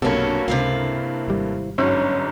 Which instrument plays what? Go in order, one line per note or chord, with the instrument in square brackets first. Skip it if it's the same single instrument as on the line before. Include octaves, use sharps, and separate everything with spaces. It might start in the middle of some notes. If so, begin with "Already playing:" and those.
[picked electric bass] B1 C3 [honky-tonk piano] G2 A#3 A4 [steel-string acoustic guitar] C#4 F#4
[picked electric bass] C#2 [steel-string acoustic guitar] C3 E4 F5
[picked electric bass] G#1 G3
[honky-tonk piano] G1 G#2 F#3 [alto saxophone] C#4